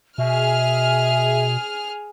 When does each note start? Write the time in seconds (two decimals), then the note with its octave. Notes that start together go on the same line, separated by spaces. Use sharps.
0.18 B2 G#4 E5 F6